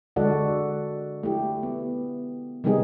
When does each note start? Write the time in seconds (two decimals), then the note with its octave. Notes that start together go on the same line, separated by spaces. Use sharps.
0.16 D3 G#3 F#4 A4 D5 F#5
1.23 A3 E4 G4
1.63 B3
2.64 C3 D#3 G3 B3 D#4 G#4